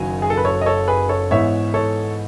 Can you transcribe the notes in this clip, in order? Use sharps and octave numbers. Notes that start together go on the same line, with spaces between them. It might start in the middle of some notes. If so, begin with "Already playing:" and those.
Already playing: F#1 F#2 D#3 F#3 G#5
G#4
A4
B4
A4 C#5
D#5
A4 C#5
G#4 B4
A4 C#5
G#2 E3 B3 C#5 E5
A4 C#5